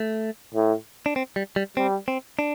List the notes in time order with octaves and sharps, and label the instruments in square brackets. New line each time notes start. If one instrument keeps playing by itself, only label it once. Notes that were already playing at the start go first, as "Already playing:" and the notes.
Already playing: [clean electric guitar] A3
[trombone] A2
[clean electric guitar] D4
C4
G3
G3
[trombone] G3 [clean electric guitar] C4
[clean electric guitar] C4
D4